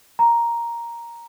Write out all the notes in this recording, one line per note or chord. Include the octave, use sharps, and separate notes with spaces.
A#5